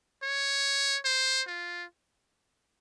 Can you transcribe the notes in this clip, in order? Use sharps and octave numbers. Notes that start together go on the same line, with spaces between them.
C#5
C5
F4